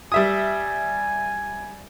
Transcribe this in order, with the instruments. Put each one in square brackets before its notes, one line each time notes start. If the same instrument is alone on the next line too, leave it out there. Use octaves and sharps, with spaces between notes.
[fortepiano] G3 E5 D#6 [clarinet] G#5